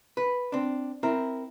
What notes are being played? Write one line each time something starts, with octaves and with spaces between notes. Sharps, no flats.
B4
C4 D4
C4 E4 A#4